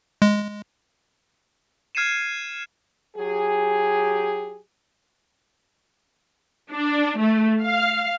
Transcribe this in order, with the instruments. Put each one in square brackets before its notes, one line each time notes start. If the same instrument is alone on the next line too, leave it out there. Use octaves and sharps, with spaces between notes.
[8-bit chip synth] G#3
[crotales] F6 G#6 C7 C#7 D#7 E7
[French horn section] F#3 G4 G#4
[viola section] D4
A3
F5